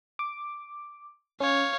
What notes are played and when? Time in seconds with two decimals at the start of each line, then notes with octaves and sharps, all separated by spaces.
0.19 D6
1.40 C#4 C#5 F5